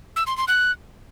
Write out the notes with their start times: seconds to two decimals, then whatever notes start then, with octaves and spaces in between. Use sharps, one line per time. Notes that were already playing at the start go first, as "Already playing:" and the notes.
0.16 E6
0.27 C6
0.37 C6
0.48 F#6